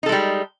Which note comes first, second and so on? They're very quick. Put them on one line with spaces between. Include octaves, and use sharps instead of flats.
D#4 A4 G#3 G3